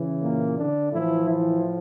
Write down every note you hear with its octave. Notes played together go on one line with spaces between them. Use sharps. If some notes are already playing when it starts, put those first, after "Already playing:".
Already playing: C#3 E3
A#2 A#3
D3 D4
A2 E3 F3 E4
E3 E4